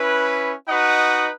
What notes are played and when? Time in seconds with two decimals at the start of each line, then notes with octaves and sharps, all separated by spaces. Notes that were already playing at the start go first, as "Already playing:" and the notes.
Already playing: C#4 E4 B4
0.68 D#4 F#4 B4 D#5 F#5